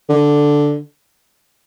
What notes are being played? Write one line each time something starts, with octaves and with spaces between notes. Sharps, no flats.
D3